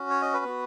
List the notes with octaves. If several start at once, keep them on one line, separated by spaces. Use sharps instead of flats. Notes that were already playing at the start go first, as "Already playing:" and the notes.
Already playing: C#4 F#4
C#5
D#5
B4
B3 F#4